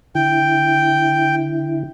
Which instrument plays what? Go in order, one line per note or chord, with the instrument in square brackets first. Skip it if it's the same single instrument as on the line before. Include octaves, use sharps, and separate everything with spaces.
[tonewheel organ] D3 E4 [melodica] G5